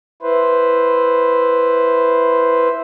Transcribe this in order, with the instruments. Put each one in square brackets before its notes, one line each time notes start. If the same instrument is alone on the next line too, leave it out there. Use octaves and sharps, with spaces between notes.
[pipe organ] E4 B4 C5